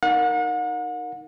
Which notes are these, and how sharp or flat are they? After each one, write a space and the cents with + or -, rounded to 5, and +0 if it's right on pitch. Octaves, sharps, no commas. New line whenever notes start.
D#4 +0 A#4 +0 F#5 -40